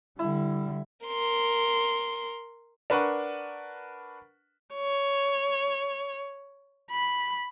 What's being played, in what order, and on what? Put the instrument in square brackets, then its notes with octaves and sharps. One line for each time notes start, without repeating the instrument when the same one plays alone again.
[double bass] D3 G3 [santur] E4
[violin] A#4 C6
[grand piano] D4 A#4 B4 F#5 C#6
[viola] C#5
B5